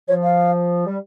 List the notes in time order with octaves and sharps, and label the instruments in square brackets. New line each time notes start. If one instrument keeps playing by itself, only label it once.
[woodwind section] F3 [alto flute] C#5
[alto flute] F5
[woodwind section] G3